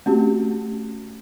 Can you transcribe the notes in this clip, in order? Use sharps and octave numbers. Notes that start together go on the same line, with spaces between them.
A3 C4 C#4 F#4 G4